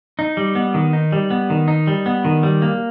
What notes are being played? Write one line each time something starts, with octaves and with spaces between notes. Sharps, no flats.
D#4
G3
B3
D#3
D#4
G3
B3
D#3
D#4
G3
B3
D#3
G3
A#3